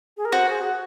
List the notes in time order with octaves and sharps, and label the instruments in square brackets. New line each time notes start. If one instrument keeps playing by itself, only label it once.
[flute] G#4
A#4
[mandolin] F#4 [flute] C5
[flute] G#4
F#4